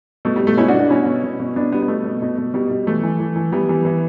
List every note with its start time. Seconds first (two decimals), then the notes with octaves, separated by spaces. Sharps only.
0.25 B2 A3
0.36 G3
0.41 B2
0.47 A3
0.57 B2 C#4 E4
0.68 D4 F#4
0.74 B2
0.79 D4 F#4
0.90 B2 C#4 E4
1.06 B2
1.24 B2
1.40 B2
1.56 B2 B3 D4
1.72 B2 G3 B3
1.82 B3
1.88 B2 A3
2.05 B2
2.22 B2
2.38 B2
2.54 B2 G3
2.71 B2
2.87 E3 A3
3.03 E3
3.20 E3
3.36 E3
3.52 E3 G3 B3
3.69 E3
3.85 E3